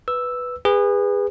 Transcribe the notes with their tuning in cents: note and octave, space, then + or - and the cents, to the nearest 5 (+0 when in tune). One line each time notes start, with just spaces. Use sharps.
B4 +0 E6 +0
G#4 -30 B4 +0